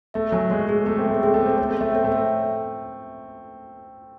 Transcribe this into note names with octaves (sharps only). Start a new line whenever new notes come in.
A3 E5
F#3 G#5
G#3 C#5
A3 G#4
A3 C#5
C4
A3 E5
C4 G#4
A3
E5
C4
A3 C#5
C4
A3 E5
C4 C#5
A3
E5